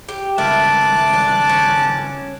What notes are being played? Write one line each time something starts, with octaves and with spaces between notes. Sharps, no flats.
G4
C#2 G2 A#4 E5 A5 D6 F#6
D4
C#4